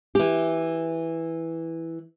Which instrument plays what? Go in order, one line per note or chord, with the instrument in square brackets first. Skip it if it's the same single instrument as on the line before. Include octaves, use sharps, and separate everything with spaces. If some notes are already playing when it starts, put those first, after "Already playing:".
[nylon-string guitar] E3 G4